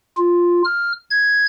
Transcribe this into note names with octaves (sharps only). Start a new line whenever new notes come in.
F4
F6
G#6